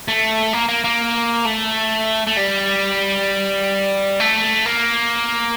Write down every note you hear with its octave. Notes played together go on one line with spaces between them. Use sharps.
A3
A#3
A#3
A#3
A3
A3
G3
A3
A#3